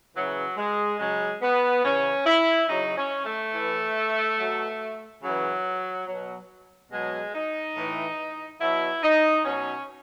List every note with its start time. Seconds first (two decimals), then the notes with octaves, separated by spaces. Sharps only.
0.15 C#3 E3 F#3
0.57 G#3
1.00 C#3 F#3 G#3
1.42 B3
1.84 C#3 E3 C#4
2.26 E4
2.68 C#3 F#3 D#4
2.97 C#4
3.25 A3
3.53 A2 E3
4.39 B2 F#3
5.23 C#3 E3 F#3
6.07 B2 F#3
6.92 B2 F#3 G#3
7.34 D#4
7.76 A2 E3
8.60 B2 F#3 E4
9.03 D#4
9.45 B2 F#3 C#4